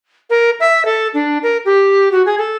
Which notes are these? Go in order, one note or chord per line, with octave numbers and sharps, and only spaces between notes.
A#4
E5
A4
D4
A#4
G4
F#4
G#4
A4